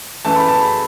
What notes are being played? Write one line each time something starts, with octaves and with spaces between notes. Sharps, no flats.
F#2 E3 A3 A5
B5
A5
B5